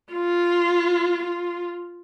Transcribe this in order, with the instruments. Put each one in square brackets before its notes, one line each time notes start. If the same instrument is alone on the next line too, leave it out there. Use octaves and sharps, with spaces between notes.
[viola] F4
F4